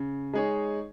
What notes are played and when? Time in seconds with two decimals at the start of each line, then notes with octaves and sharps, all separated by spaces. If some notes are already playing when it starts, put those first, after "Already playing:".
Already playing: C#3
0.33 G#3 D#4 G#4 C#5